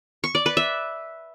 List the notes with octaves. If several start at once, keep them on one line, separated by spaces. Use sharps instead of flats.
C#6
D5
B4
E5